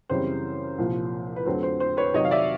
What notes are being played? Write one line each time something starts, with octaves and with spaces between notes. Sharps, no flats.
F#2 C#3 E3 G3 C4 C5
C2 A#2 F3
B4
F2 D3 F#3 A3 C4 C5
C5
C5
B4 C#5
C3 D#3 F#3 C#5 D#5
F5
D5 E5